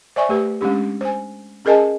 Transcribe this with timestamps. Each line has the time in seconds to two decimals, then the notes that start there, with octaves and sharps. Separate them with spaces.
0.16 C5 D5 E5 G#5 C#6
0.29 A3 G4 B4
0.61 G#3 C#4 D4 G4
1.01 C5 G#5
1.65 C#4 G#4 A#4 D#5 G#5 A5